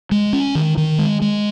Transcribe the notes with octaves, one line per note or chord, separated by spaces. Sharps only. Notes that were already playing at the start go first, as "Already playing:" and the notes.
G#3
C#4
D#3
D#3
G#3
G#3